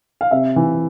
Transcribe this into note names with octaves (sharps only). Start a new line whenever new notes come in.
F5
C3 E5
E3